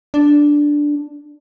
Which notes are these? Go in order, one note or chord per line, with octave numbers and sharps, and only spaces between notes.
D4